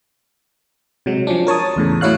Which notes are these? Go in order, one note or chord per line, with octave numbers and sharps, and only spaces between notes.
C3 F#3 G#3
F3 C#4 D4
A#4 C#5 A5 D#6
E2 A2 C#3
A2 F#3 E4 C#5 F5 F#6